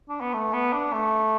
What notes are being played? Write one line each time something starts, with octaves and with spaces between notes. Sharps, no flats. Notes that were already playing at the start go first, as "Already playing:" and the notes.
D4
B3
A3
B3
D4
A3